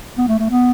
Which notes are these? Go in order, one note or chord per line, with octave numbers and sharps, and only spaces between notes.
B3
A3
A3
B3